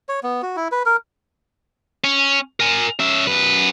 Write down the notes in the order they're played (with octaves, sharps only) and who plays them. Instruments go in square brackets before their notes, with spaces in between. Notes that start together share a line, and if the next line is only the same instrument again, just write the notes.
[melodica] C#5
B3
F#4
E4
B4
A#4
[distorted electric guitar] C#4
A#4 G#5
C#4 E5
F#2 B4